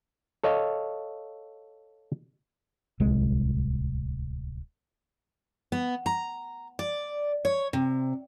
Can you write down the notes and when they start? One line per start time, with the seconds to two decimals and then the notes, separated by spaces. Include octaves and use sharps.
0.44 A4 C#5 D#5 F5
3.00 D1 C2 G#3
5.72 B3
6.06 A#5
6.79 D5
7.45 C#5
7.73 C3